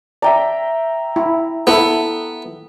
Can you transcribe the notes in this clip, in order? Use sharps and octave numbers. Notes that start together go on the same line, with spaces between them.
D5 E5 G5 A#5
E4
B3 E4 A4